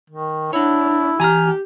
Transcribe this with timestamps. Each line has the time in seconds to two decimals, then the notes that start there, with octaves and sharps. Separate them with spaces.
0.10 D#3
0.53 D4 E4 C#5 F#5
1.20 E3 G4 G#5 A#5 F6